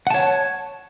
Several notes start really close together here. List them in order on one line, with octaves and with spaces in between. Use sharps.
F#5 A5 C#5